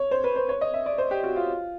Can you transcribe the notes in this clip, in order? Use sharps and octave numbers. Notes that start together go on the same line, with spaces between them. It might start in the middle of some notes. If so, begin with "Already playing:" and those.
Already playing: C#5
C5
B4
C5
C#5
D#5
E5
D5
C5
G4
F#4
F4